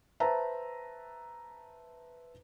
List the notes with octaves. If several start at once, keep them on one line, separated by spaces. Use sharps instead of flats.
B4 C5 E5 A5 A#5